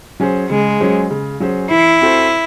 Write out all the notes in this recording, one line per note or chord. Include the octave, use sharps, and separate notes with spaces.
F#3 C#4 G#4 C5
C#3 G#3
F#3 C#4 G#4 C5
C#3
F#3 C#4 G#4 C5
E3 E4
C4 F#4 A4 C5